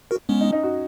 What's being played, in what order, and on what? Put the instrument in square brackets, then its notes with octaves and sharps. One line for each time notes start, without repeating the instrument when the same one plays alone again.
[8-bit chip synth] F#4 A#4
[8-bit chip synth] G#3 B3 [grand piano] C#4
[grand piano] D#4
D#4
F#4